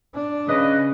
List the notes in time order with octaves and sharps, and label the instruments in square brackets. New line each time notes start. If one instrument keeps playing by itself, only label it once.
[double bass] D4
[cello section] C#3 [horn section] B4 D#5